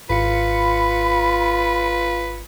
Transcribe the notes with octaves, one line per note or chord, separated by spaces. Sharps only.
G#1 F4 B4 B5 C#7